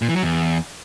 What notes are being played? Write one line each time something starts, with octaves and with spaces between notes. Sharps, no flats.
A#2
E3
F#3
E2